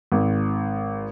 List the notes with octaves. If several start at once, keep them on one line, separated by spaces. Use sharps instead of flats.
G#1